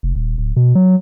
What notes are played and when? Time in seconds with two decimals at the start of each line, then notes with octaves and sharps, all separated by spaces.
0.03 F1
0.15 D#1
0.38 D1
0.56 B2
0.75 F#3